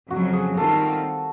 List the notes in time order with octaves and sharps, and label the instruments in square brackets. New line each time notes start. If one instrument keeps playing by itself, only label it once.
[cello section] F2 C#3 F#3 [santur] F#4
[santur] G#4
[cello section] D#3 G3 C4 F4 [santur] A4